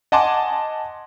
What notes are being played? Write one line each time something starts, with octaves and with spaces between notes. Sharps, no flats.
D#5 F#5 G#5 A5 C6 D6